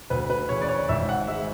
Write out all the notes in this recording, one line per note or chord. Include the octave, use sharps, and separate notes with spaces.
D2 B4
B4
C#3 E3 C#5
D5
C#5
G#1 E5
F#5
G#3 E5